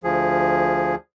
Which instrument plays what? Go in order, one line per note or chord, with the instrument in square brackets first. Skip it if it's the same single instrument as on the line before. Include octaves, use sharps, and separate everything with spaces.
[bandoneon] D2 F3 G#4